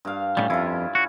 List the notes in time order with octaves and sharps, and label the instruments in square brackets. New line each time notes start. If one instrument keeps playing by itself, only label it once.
[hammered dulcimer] G2 F5
[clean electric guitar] A2 C#3 G3 [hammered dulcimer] C#4
[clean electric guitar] F2 [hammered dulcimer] E4 F4
[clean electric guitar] F#4